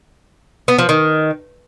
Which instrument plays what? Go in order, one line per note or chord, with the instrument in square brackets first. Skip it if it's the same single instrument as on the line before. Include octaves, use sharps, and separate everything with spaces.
[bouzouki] B3
F3
D#3